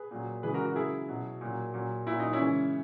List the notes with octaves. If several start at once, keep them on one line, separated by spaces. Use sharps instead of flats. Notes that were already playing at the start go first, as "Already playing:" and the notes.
Already playing: G#4 B4
A#2 F#3
C#3 E3 G#3 G#4 B4
F#4 A#4
F#4 A#4
C#3 F#3 E4 G#4
B2 F#3
A#2 F#3
A#2 F#3
A#2 F#3 E4
D#4
C#4 E4
C#3 E3 G#3